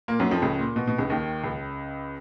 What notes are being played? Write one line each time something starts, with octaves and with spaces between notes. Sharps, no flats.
A#2 A#3
F#2 F#3
F2 F3
C#2 C#3
A#2
B2
B2
C#2 C#3
D#2 D#3
C#2 C#3